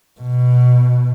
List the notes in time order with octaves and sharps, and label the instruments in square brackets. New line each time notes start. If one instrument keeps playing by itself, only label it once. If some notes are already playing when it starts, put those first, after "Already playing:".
[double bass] B2